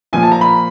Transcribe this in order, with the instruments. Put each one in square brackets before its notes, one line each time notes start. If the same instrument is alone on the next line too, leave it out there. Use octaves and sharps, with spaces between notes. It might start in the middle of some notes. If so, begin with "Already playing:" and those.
[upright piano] A#2 F3 G#5
A5
A#5
B5